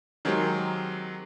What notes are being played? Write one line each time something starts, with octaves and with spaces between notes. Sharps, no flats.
D#3 F#3 G#3 C4 G4 A#4